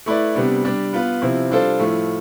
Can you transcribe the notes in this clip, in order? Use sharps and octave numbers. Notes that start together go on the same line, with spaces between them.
A3 E4 B4 D5
C3 G3 B3 D4
G3 D4 G4
B3 F4 B4
C3 F3 C4 E4
G3 D4 F4 A4 C5
A2 F3 A3